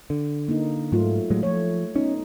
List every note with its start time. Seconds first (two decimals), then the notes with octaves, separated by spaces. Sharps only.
0.10 D3
0.48 A#3 D#4
0.92 G#2 F#3 A3 F4
1.30 A2 F#3 G#3
1.43 F3 A3 C#5
1.96 B3 C#4 D#4